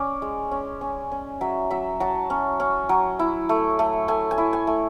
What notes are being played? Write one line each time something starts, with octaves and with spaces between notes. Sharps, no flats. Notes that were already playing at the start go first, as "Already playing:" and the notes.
Already playing: C#4 D5
G#3
C#4
C#4
C#4
F#3 E5
F#3 E5
F#3 A5
C#4
C#4
F#3
E4
A3
A3
A3 G#5
G#5
E4
G#5
A3